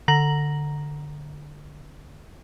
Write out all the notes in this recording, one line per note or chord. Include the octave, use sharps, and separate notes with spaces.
D3 A#5 A#6 F#7